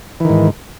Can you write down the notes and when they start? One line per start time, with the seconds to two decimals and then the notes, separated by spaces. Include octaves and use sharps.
0.20 E3
0.25 D#3
0.30 G#2